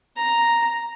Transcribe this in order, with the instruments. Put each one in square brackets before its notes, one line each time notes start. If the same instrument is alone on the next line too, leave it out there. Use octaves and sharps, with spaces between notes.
[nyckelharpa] A#5